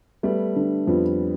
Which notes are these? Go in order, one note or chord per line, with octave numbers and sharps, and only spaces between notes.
G3 A3 B3
D3
F2 G3 B3